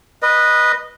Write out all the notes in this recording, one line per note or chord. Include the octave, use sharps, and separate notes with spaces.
B4 D#5